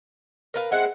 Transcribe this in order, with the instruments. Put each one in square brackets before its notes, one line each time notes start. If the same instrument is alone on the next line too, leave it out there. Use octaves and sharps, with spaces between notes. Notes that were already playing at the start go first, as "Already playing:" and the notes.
[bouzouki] A#4 B4 F5
[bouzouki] G#3 C4 E4 [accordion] F#5